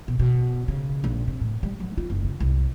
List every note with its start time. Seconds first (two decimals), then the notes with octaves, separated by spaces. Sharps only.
0.08 B2
0.19 B2
0.68 C#3
1.04 A#1
1.28 C3
1.41 A2
1.63 G3
1.80 F#3
1.98 F4
2.10 F#1
2.24 C#3
2.40 C2